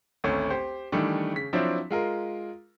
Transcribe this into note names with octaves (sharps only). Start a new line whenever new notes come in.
G#1 D2 A3 C#4
G4 C5
D#3 E3 G3 A3 D4
C#3 B6
F3 F#3 C4 D4 E4
G#3 F4 A#4